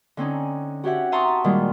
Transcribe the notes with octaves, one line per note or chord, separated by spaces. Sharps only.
D3 C4 C#4 D#4
F#4 G4 C#5 E5 F#5
E5 A5 A#5 C6 C#6 D#6
A5
A#2 D#3 G3 G#3